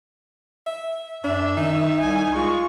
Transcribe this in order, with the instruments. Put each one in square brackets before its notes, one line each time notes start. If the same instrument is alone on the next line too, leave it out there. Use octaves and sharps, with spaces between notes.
[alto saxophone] E5
[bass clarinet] F#2 [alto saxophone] D4 [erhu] E5
[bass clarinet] D#3 [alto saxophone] D#4
[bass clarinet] C2 [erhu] G#5
[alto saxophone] G#3 [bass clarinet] F4 [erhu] C#6